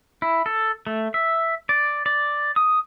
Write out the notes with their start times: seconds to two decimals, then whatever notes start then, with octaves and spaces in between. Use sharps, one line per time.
0.22 E4
0.46 A4
0.87 A3
1.14 E5
1.69 D5
2.06 D5
2.56 D#6